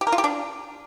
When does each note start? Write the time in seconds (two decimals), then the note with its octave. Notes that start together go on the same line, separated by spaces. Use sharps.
0.01 G4
0.07 A#4
0.12 F4
0.18 G4
0.24 D4